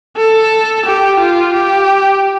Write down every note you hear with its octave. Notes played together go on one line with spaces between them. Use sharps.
A4
G4
F4
G4